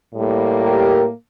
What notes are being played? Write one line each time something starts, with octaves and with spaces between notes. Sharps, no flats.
A2 G3 A#3
G4 A#4